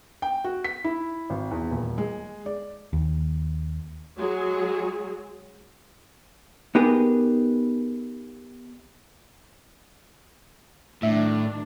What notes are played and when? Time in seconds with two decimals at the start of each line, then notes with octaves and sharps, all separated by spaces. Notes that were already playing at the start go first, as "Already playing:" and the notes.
0.22 G5
0.44 F#4
0.64 B6
0.84 E4
1.30 G#1
1.51 E2
1.71 D#1
1.98 G#3
2.46 D5
2.93 D#2
4.17 F#3 G#3 F#4 G#4
6.75 B3 D#4 G4 G#4 A#4 B4
11.03 A2 D#3 F#3 D4 E5